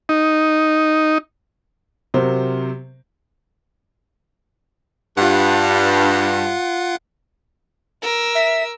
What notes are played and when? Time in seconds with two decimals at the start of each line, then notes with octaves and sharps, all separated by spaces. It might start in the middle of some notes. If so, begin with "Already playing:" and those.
0.09 D#4
2.14 C3 F#3 A#4 C5
5.17 G2 F4 F#5
8.02 A#4 E6
8.35 E5